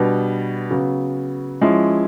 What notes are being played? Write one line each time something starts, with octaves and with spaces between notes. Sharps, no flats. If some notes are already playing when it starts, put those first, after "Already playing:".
Already playing: B2 G3 B3 D4
C#3 F#3 B3
F3 G#3 C#4 E4